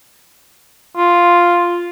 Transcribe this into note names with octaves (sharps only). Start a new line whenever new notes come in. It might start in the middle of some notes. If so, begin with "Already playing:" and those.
F4